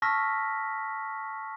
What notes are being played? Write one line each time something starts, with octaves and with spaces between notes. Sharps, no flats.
A5 C#6 E6 F6 A#6 B6